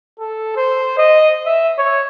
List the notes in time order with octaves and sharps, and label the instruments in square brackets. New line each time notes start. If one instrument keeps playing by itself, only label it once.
[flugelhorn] A4
C5
D#5
E5
C#5